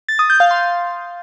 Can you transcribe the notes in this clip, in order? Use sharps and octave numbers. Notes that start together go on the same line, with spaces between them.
A6
D#6
G6
F5
C6